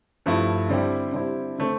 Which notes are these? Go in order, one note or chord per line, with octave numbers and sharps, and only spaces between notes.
G2 F3 A3 E4
D3 G3 C4 E4 G4
D3 G3 C4 E4 G4
D3 A3 C4